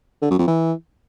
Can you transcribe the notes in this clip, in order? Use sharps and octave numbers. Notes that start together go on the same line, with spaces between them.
D3
F#2
F2
E3